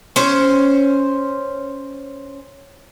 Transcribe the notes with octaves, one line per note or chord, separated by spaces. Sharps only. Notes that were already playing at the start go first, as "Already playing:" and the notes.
C#4 C5